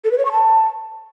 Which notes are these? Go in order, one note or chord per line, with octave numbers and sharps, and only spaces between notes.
A4
B4
C#5
C#6
A5